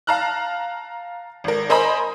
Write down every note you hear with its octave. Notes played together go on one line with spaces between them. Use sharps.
F5 A5 A#5 F6 F#6
G#1 A#4
A#4 C5 D#5 G#5 A#5 B5